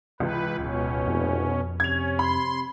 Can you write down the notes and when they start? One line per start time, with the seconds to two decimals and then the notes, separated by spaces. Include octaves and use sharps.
0.20 C#2 C3 E3 B4
0.58 D1 B2 C#4
1.06 F1 F2
1.80 C3 C#4 G#6 F7
2.19 B5 C6